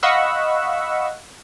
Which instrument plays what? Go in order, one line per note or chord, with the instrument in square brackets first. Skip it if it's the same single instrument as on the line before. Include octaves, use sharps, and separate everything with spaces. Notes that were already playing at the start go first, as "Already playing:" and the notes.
[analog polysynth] D#5 F5 F#5 B5 C#6 E6